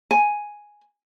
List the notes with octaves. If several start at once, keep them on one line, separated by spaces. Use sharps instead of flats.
G#5